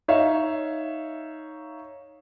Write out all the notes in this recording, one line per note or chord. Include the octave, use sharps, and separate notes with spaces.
D#4 C#5 E5 F5